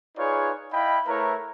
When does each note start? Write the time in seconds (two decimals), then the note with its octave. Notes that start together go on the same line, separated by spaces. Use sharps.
0.17 D#4 F4 G#4 B4 C#5 D5
0.73 E4 D#5 F5 G5 B5
1.07 A3 E4 A#4 B4 C#5 A#5